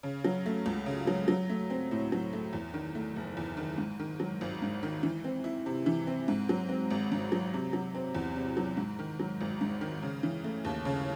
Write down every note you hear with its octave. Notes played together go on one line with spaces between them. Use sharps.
C#3
F#3
A3
C#2
C#3
F#3
F#3
A3
C4
A2
F#3
A3
E2
D#3
A3
F#1
E2
D#3
G#2
D#3
F#3
G#1
G#2
D#3
E3
C4
E4
C3
E3
C4
G#2
F#3
C4
G#1
G#2
F#3
C3
F#3
C4
E2
C3
F#3
G#2
D#3
F#3
G#1
G#2
D#3
C#3
E3
A3
D#2
C#3